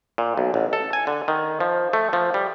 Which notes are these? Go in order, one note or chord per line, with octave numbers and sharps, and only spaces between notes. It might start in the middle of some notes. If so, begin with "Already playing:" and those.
A#2
B1
A1
A4
G#5
D3
D#3
F3
A3
F3
G3